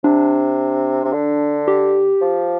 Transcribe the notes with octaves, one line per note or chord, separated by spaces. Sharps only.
C3 D4
C3
D3
G4
F3